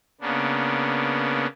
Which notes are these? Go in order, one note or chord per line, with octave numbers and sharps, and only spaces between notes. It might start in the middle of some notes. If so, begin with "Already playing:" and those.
C#3 A#3 B3 D4